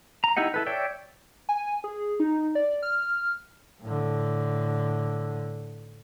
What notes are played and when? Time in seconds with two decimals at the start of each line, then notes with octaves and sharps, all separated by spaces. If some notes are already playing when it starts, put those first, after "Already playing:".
0.24 A#5
0.37 D#4 E4 G4 D#5 F#5
0.54 E4 A4 B4
0.66 C#5 D5 E5 G5
1.49 G#5
1.84 G#4
2.20 D#4
2.55 D5
2.83 F6
3.82 A2 D3